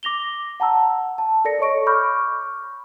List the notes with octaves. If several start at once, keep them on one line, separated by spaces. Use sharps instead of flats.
D6 A#6 F7 G7
F#5 A5 A#5 E6
A5
A4 A#4 D5 A#6 C#7
A4 C#5 D#5 C#6 D7
B5 C#6 D6 F6 G6